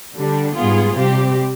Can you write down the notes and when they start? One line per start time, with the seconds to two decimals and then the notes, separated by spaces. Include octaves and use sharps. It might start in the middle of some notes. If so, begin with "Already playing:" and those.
0.16 D3 G3 D4
0.55 G#2 G3 B3 F4 G#4
0.95 C3 G3 C4 G4